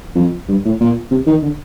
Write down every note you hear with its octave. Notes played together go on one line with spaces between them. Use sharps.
F2
G2
A2
A#2
C3
D#3
D3